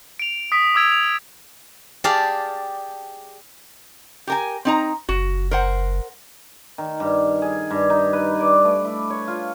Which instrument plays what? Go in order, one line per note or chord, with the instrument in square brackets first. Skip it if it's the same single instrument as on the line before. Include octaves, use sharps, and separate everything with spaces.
[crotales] D7 F7
D#6 B6 D7
D6 E6 G#6 D7 F7
F7
[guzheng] G4 G#4 D5 F5 A5
[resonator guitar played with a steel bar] G4 A#4 G#5
C4 D#4 A#5
[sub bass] F#1 [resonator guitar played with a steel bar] F#4
[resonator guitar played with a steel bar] A#4 C5 F#5
[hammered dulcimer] D#3
G2
G#4
G2
D#4
B4
D5
A3
E4
C#5
F4